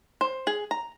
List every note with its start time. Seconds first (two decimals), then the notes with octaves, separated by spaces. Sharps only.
0.21 C5
0.47 G#4
0.71 A#5